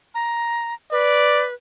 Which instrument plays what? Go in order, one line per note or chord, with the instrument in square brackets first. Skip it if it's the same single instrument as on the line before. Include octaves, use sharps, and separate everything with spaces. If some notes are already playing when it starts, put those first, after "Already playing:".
[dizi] A#5
[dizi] B4 [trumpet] D5